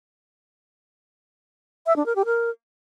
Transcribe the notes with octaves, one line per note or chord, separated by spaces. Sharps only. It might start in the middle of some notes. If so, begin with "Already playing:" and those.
E5
D4
A#4
G4
A#4